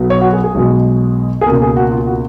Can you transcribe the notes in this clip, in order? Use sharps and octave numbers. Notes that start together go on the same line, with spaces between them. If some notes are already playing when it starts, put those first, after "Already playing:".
Already playing: B1 B2 F#3 B3
C#5
F#4
G#4
G#4
B1 B2 G#3
G#4
C#2 B2 A#3 A#4
G#4
F#4
F4
F#4